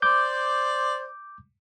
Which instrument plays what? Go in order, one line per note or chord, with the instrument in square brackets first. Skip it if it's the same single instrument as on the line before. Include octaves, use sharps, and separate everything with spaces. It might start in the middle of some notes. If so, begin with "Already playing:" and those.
[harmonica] C5 D5 [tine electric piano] D6 G6